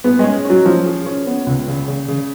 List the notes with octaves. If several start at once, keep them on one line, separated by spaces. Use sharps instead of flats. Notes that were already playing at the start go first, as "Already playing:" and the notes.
B3 G#4
G#3 C#4
F#3 C#4
F3 C#4
G#4
C#4
B3
C#2
C#3
C#3
C#3